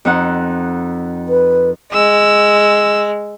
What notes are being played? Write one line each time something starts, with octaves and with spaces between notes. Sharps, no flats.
F2 D#4 F#5
B4
G#3 E6